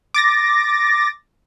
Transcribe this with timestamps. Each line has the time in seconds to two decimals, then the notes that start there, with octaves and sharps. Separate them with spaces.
0.14 D6 A6 A#6